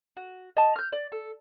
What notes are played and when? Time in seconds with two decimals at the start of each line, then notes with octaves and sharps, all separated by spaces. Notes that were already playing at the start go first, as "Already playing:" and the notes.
0.17 F#4
0.57 D#5 A5
0.76 F6 G6
0.92 D5
1.12 A4